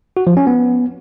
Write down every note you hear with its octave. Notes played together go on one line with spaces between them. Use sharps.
F#4
F3
C#4
B3